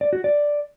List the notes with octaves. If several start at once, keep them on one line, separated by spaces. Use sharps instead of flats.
D5
F#4
D5